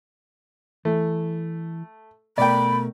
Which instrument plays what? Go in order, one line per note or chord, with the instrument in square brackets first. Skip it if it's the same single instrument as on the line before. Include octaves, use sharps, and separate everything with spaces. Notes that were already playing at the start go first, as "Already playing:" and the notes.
[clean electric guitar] E3 [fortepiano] A3
[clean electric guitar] B2 A3 A#4 [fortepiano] D5 G5 [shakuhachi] B5